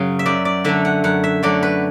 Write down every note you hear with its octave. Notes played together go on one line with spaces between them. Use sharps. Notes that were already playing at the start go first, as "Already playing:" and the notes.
Already playing: F#2 C#3 F#3
E5
F#2 D5
D5
D3 F#3 A3 E5
F#5
F#2 F#5
E5
D3 F#3 A3 D5
B4